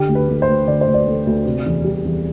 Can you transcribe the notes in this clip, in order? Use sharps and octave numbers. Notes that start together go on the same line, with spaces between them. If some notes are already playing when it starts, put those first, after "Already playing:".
Already playing: D3 G4
D2
B4
A3
C5
D2
D3 D5
C5
D2
D5
A3
D2
C3
E2
G3
E2